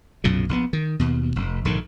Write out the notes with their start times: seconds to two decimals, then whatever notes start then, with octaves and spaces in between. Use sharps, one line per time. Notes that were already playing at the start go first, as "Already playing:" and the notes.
0.24 B1 F#2 A#2 C#3
0.49 A#1 D#3 B3
0.73 D#3
0.99 D#2 B2
1.36 F1
1.65 A#1 G#2 D3 D#3